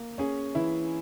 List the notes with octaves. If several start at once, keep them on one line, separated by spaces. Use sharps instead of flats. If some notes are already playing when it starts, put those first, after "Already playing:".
Already playing: A#3
C#4 G#4 G#5
E3 E4 E5